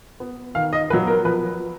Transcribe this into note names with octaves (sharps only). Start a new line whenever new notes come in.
B3
D#3 F5
D#5
F#3 B3 B4
A#4
F3 B4